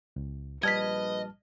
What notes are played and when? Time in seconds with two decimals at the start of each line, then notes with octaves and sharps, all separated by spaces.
0.16 C#2
0.63 A#1 G3 B4 D#5 A5 F6 G#6 B6